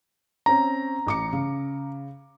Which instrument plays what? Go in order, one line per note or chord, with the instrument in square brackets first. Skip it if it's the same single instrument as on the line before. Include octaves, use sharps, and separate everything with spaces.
[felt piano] C4 C#4 [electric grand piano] A#5
[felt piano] A1 D6 C#7
C#3